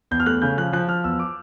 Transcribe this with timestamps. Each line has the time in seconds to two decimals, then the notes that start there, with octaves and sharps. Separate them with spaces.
0.11 E2 G6
0.20 F6
0.26 A3 F#6
0.42 C#3 G6
0.58 F3 F#6
0.73 F3 F#6
0.88 F3 F6
1.04 E2 E6
1.19 D6